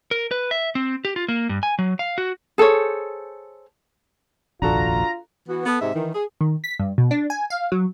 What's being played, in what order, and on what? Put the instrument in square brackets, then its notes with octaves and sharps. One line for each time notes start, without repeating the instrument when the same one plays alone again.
[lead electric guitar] A#4
B4
E5
C4
G4
F4
A#3
G2
G#5
F#3
F5
F#4
[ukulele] G#4 A4 C5 C#5
[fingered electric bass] F1 A#1 D#2 [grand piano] D4 F#4 A4 [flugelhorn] F4 [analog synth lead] A#5
[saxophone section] E3 B3 F#4
B3 A4
G#2 C3 D#5 E5
D#3 E3
G#4
[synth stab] D#3
B6
G2
B2
D4
G#5
F5
F#3